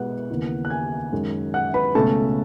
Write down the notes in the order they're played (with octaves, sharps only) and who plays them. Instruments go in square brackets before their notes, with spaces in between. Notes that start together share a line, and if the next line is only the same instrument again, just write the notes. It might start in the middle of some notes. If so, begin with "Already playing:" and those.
Already playing: [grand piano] B2 G#3 B3 F#5 F#6
D#2 C#3 E3 B3
F#6
G#5 G#6
F#2 D#3 G#3
F#5 F#6
B4 B5
C#2 B2 A3 C#4 A4 A5